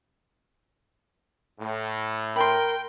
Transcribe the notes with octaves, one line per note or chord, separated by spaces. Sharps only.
A2
A#4 G5 B5 C6